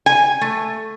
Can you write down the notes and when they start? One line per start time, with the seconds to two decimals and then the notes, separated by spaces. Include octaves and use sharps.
0.06 G#5
0.41 A3